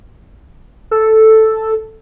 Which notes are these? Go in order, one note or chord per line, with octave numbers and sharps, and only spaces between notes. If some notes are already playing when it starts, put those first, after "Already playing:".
A4